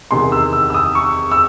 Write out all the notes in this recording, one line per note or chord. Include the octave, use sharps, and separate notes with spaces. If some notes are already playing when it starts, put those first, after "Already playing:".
E2 C3 D#3 C6
E6
E6
E6
D#6
C#6
E6